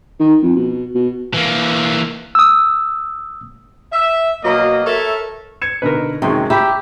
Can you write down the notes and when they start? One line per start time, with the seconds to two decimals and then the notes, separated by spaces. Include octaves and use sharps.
0.20 D#3
0.42 F2
0.56 B2
0.95 B2
1.34 E3 A#3
2.35 D#6 E6
3.93 E5
4.44 B2 F#3 A#3 A#4 D#5
4.86 A4 A#4 C#5 E5
5.62 G#6 C#7 E7
5.82 B2 D3 D#4 A#4 B4
6.22 F#2 C3 D#3 G#3 G5 C6 C#6
6.50 G4 E5 A#5 B5